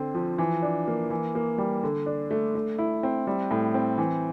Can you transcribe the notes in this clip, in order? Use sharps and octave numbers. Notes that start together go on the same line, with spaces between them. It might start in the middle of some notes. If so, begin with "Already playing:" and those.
Already playing: D3 C4
F3
E3
D4
A#3
E3
A#3
G3
D3
D4
A3
A3
E4
C4
G3
A2
C4
E3